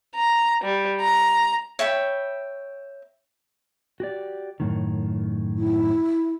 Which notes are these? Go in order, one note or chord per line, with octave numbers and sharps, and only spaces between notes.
A#5
G3
A#5
C#5 E5 G5 B5
F#4 G4 D5
F#2 A2 D#3
E4